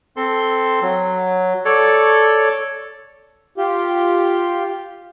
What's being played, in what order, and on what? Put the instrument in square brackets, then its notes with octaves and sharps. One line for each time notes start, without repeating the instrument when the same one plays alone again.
[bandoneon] C4 A4 C6
F#3
A4 C#5 D5
[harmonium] F4 G4